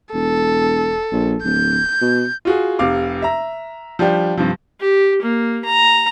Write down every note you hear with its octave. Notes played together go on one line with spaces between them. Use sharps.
E1 A4
A#1
D1 G6
B2
F4 F#4 G#4
F1 C3 F5 D6
E5 A#5
F3 G3 D4 G4
G2 C3 F3
G4
A#3
A#5